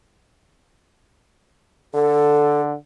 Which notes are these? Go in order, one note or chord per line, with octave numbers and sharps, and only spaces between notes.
D3 A4